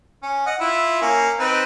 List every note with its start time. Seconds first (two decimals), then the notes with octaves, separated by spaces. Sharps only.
0.23 C#4
0.46 D#5 F#5
0.60 E4 F4
1.02 A#3 C#4
1.39 C4 D#4 B4